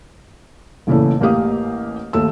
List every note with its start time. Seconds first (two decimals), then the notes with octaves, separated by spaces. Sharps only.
0.87 A1 A#2 C#3 E3 A3
1.20 A1 A#3 G4 F5 D#6
2.13 D#2 A3 E6